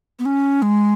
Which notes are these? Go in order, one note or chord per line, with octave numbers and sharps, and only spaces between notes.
B3
C#4
G#3